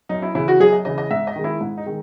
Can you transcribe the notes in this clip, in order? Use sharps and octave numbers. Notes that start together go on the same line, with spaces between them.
F#2 D#4
E4
C#3 E3 E4
F#4
F#2 G#4
D#5
C#3 E3 D#5
D#5
G#2 E5
D#5
D#3 G#3
E4
G#2
D#4
D#3 G#3